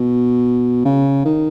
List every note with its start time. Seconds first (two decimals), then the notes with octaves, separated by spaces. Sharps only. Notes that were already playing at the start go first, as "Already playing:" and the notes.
Already playing: B2
0.86 C#3
1.25 D#3